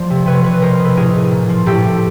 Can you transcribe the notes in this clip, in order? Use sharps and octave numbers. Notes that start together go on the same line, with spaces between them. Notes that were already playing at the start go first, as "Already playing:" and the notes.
Already playing: F3 C5 D5
C3
C3 B4 C#5
F3 B4 C#5
B4
B2 A#4 C5
B2
A4 B4
A2 G#4 A#4
A2
A#2
F3
A2 G4 A4
A2